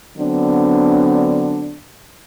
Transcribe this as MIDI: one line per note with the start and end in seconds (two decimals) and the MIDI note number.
0.17 1.78 50
0.17 1.78 54
0.17 1.78 59
0.17 1.78 60
0.17 1.78 62